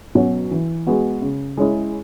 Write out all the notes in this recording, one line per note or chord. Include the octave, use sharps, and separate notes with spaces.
B2 F#3 C#4 F#4
E3
G#3 B3 F#4
C#3
G#3 C#4 E4 G#4